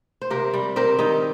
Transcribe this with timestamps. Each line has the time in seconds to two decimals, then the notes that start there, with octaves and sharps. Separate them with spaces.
0.22 C5
0.30 C3 G4 A#4
0.54 G3
0.76 C4 G4 A#4
0.98 D#3 D#4 G4